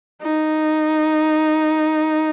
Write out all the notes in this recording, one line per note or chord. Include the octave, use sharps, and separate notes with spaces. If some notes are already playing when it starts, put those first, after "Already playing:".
D#4